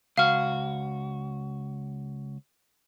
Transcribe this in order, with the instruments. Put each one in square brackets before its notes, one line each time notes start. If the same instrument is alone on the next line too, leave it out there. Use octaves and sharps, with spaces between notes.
[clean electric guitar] C#2 F#4 [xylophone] F5 F6